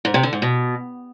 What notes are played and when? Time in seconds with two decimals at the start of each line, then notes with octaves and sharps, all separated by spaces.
0.05 G#2
0.14 C3
0.23 D3
0.33 G#2
0.42 B2